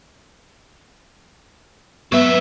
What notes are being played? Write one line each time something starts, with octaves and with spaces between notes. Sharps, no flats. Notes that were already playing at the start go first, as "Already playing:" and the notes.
F#3 B3 E5